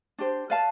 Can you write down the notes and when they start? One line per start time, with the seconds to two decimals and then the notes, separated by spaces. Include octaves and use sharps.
0.19 D4 G4 C5
0.50 B4 D5 F5 A5